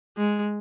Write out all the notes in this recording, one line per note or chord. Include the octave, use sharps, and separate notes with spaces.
G#3